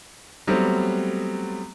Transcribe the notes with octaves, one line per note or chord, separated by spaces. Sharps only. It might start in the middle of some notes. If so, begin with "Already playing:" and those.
F#3 G3 A3 B3 C4